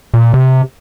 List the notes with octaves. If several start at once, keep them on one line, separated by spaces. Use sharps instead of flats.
A#2
C3